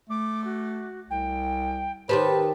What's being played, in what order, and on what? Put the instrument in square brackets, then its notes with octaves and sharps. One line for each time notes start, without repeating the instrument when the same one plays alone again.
[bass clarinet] A3 [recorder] D6
[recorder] F#4
[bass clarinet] C2 [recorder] G5
[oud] D#3 G4 C5 [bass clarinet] B4 [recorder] A5